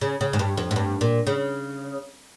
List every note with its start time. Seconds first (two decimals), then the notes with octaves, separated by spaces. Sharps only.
0.01 C#3
0.21 C#3
0.33 G#2
0.39 G2
0.57 F2
0.71 G#2
0.76 G2
1.01 A#2
1.27 C#3